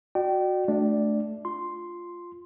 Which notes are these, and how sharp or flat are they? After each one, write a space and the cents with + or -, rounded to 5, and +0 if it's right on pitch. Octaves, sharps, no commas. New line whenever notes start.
F#4 -15 D5 +35 G5 -25
A3 -20 D4 +0 D5 +0
F4 +0 C6 +0